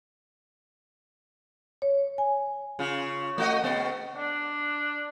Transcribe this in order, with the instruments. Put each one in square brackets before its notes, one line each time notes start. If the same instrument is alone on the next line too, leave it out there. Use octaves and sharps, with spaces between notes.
[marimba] C#5
G#5
[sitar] C#3 F4
A3 F#4 D#5
C#3 B3
[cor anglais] D4